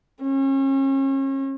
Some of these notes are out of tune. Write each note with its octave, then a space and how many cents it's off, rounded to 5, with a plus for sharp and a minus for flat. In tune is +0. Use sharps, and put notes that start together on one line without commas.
C#4 -35